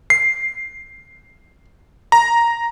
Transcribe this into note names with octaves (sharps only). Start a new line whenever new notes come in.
C7
A#5